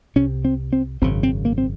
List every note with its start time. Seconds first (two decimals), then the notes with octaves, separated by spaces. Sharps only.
0.16 C2 C3 C#4
0.45 C4
0.73 C4
1.02 G#1 F#2 C#3 C4
1.23 C4
1.45 A#3
1.58 C4